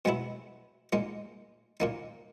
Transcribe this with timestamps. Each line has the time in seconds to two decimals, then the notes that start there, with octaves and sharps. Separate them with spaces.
0.05 B2 G#3 B3 E4
0.93 A#2 G#3 D#4
1.80 A#2 A#3 D#4